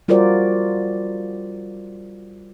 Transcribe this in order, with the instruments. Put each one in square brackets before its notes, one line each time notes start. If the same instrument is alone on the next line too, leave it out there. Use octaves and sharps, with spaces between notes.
[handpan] G3 F4 F#4 A#4 C5 D5